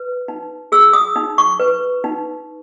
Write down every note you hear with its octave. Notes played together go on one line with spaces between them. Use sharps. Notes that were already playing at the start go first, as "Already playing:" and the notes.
Already playing: B4
D#4
G#4 E6
D#6
D#4
C#6
B4
D#4